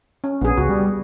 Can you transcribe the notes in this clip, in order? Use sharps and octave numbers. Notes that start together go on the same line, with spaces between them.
C#4
A#1 B3 G#4
C#2 F#4
G3